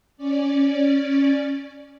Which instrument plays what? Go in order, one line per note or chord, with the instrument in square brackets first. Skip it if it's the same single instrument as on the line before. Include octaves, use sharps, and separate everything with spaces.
[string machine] C#4 D5